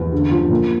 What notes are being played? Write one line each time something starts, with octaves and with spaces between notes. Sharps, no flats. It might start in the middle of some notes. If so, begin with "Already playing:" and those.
Already playing: E2
D3
F3
A#2